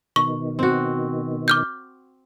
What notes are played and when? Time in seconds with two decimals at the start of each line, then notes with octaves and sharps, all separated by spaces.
0.16 B2 D#3 C#6
0.59 C4 F#4
1.48 D6 F6 G6